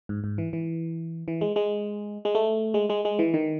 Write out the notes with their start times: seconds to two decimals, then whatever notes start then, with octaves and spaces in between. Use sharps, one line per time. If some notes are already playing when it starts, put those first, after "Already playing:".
0.09 G#2
0.24 G#2
0.38 E3
0.53 E3
1.28 E3
1.41 G#3
1.56 G#3
2.25 G#3
2.35 A3
2.74 G#3
2.90 G#3
3.05 G#3
3.19 E3
3.34 D#3